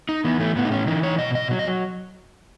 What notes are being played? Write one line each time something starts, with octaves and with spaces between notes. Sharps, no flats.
D#4
E3 B3
A3
A2 B3
D#4
C#4
E3 D#4
C#5
B2 D#5
D#5
F#3
D#5